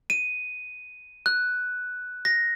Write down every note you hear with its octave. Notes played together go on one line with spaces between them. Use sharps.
D#7
F#6
A#6